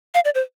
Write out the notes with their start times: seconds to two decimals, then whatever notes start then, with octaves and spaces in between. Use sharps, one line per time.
0.14 F5
0.25 D5
0.35 C5